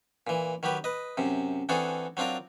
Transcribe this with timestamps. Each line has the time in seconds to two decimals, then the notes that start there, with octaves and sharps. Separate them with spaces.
0.27 A#2 E3
0.63 D#3 F#3 G4 B4
0.84 B4 D#5
1.17 F#2 C3
1.69 E3 C4 D4 F#4 G#4 A4
2.17 F#3 C4 D4 F4 A#4